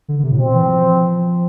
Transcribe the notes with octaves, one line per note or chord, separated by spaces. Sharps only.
D3
D3
C3
A2
B2 C4
E3
F3